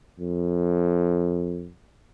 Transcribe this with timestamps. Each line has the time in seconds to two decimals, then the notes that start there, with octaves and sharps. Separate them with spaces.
0.19 F2